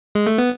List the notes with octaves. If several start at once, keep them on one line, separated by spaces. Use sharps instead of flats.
G#3
A3
B3